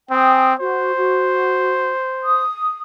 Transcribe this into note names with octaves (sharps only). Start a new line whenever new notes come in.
C4 G5 G#5 D#6
F#4 C5
F#4
D#6